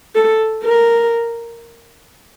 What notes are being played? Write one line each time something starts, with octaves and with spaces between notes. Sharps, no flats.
A4
A#4